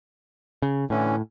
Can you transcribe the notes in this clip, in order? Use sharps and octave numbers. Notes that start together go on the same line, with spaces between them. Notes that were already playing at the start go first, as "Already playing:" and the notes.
C#3
A2 D3 E3 C#4